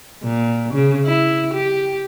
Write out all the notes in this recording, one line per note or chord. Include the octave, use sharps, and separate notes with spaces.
A#2
C#3
E4
G4